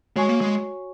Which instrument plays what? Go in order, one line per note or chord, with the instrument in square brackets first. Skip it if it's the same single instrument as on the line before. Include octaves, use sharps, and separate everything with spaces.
[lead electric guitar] G#3 [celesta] F#4 C#5 G#5 C#6
[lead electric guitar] A#3
G#3